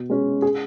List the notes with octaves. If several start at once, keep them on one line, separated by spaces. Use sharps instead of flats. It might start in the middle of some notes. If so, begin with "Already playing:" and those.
Already playing: B2
G#3 C#4
G#4